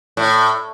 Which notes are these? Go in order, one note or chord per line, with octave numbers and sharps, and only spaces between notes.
A2